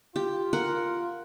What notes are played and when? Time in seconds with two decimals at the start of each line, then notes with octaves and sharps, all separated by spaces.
0.16 F4 G4
0.53 A#4 F#5